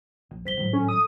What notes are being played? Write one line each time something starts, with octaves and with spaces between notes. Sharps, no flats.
A#1
B1 C5 B6 G7
G#1 A2 F#3
C#4 A4
D#6